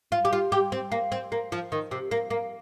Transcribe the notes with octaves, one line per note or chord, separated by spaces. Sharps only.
F4
G4
F4
G4
C4
A#3
C4
A#3
F3
D#3
C3
A#3
A#3